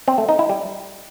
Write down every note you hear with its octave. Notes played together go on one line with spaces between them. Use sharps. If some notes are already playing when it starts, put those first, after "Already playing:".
C4
A3
D#4
E4
G3